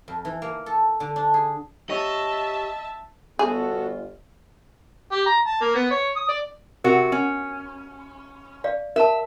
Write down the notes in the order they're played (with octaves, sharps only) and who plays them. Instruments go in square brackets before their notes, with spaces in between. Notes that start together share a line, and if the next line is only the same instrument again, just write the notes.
[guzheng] F2
E3
A#3
A4
D3
D4
G#4
[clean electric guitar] G4 C#5 [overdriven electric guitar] D#5 [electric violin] E5 A5
[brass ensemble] G1 D3 F4 [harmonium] B3 F#4 A4 [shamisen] G#4
[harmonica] G4
A#5
A5
A#3
B3
C#5
D#6
D5
[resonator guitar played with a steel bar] C3 F#4 [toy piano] A#4
[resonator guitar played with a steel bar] C#4
[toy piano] D5 F5
[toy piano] A#4 A5 [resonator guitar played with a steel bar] E5